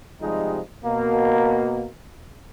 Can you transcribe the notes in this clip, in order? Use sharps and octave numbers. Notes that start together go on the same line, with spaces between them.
C3 F3 G3 G#3 D#4
B2 A#3